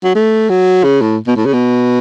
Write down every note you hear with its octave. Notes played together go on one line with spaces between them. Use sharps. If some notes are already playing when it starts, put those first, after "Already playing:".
F#3
A3
F#3
C#3
A2
B2
A2
C#3
B2